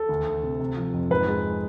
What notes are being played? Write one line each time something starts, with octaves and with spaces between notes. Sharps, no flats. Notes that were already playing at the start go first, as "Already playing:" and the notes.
Already playing: A4
D2
D2
C3
C3
F3
F2
G#2 B4
G#3